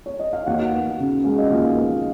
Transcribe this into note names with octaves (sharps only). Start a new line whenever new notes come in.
C#5
D#5
F5
D#2 F#4 F#5
B3
C#3
G#3 F5
D#5
D#2 F4 F5
B3